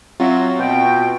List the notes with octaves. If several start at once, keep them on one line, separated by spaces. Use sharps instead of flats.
F#3 C4 F4 F#4 E5
B2 G5